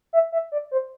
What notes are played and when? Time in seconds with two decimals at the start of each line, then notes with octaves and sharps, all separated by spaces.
0.13 E5
0.32 E5
0.52 D5
0.71 C5